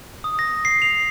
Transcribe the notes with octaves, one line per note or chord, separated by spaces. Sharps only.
D#6
A#6
C7
F7